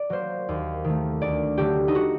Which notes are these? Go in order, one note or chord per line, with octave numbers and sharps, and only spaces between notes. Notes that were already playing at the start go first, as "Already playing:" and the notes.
Already playing: D5
F#3 A#3 C5
D#2
D#3 A3
D2 D5
D3 F#3 A3 G4
D#4
F#4